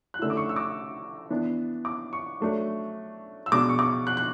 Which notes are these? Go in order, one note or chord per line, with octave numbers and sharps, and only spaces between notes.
F#6
D3 A3 C#4 E4 E6
D6
C#6
E6
D6
E3 B3 D4
D6
C#6
F#3 A3 D4
E6
B2 G#3 D4 D6
C#6
D6
F#6
F#6